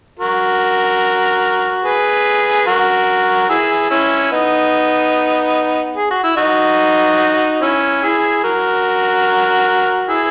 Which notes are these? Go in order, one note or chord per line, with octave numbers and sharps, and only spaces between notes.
F#4 A#4
G#4 B4
F#4 A#4
E4 G#4
C#4 E4
B3 D#4
G#4
F#4
E4
D#4 F#4
C#4 E4
E4 G#4
F#4 A#4
E4 G#4